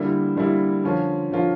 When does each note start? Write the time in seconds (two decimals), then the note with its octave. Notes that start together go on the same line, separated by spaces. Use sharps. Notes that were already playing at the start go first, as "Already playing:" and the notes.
Already playing: D3 G3 A#3 E4
0.36 D3 G3 A#3 E4
0.84 D3 F3 C#4 F4 A#4
1.31 D3 F3 C#4 F4 A#4